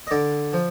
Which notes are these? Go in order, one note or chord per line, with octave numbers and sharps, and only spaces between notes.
D#5
D3 D5
F3